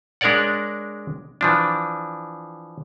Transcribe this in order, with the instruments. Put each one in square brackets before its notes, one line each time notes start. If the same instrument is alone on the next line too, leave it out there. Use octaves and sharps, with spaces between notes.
[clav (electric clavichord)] G#3 D4 A#4 C#5 D5 F#5
E3 F3 D4